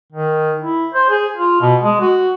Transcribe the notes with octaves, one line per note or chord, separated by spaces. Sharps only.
D#3
E4
C5
G#4
F4
B2
G#3
F#4